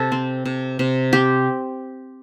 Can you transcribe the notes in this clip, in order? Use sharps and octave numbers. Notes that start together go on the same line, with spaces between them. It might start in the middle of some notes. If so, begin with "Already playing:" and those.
Already playing: C3 A4
C4
C3
C3
C4 G4